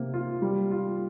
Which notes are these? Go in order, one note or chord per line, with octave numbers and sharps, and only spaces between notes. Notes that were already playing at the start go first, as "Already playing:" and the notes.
Already playing: C3 A#3
F4
G3
F4